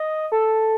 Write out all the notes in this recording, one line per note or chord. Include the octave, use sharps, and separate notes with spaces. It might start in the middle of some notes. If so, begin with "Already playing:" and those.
Already playing: D#5
A4